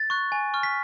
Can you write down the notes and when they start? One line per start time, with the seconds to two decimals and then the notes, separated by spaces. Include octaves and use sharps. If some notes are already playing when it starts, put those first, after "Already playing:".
Already playing: A6
0.10 C#6 F#6
0.32 G#5
0.54 C#6 F6
0.63 B6